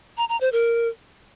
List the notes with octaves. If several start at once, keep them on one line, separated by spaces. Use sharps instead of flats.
A#5
A#5
C5
A#4